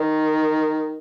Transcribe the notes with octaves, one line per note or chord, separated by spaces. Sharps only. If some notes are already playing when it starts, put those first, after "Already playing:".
Already playing: D#3